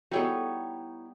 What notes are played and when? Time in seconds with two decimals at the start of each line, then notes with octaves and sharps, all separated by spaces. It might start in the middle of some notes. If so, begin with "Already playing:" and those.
0.11 G3 B3 D#4 E4 F#4 G#4 A4 C#5